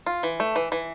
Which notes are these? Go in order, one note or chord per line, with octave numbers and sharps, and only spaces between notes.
F4
E3
A3
E3
E3